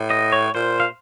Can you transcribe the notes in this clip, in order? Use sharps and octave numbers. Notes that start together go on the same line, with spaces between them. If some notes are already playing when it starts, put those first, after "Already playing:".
Already playing: A2
D#5
C#5
A#2 C5
F5